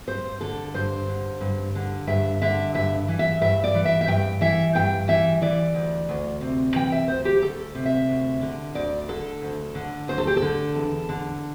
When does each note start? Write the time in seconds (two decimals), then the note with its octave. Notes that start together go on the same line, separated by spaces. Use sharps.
0.07 G2 C5
0.41 D3 A4
0.74 G2 C5
1.08 D3
1.41 G2
1.75 D3
2.07 G2 E5
2.42 D3 E5
2.74 G2 E5
3.08 E3
3.19 E5
3.41 G2 E5
3.64 D5
3.74 E3
3.85 E5
4.01 E5
4.07 G2 G5
4.41 E3 E5
4.75 G2 G5
5.08 E3 E5
5.41 E3 D5
5.74 D2
6.09 D2
6.41 C3
6.75 E3 G5
6.92 E5
7.08 D2 C5
7.25 G4
7.42 D2 A4
7.75 C3
7.86 E5
8.09 D2
8.41 D3
8.74 D2 D5
9.08 D3 A4
9.42 D2
9.75 D3
10.08 D2 C5
10.18 A4
10.27 G4
10.37 A4
10.42 D3
10.75 E2
11.09 D3